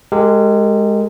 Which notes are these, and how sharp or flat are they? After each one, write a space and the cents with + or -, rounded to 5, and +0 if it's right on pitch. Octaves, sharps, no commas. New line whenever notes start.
G#3 +0 G4 +0 A#4 -40